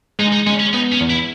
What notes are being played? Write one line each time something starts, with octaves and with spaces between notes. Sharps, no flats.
G#3 D#4
D#4
G#3 C#4
C#4
B3 D#4
C#4
E2
E4